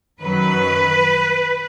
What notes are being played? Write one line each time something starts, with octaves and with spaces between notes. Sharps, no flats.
F#2 D#3 F#3 B4